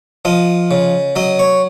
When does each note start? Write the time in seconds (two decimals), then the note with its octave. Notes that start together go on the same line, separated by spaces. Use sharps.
0.25 F3 D#5
0.71 C#3
1.16 F#3 D#5
1.39 C#5